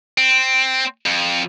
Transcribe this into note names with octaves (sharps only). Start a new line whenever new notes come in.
C4
F2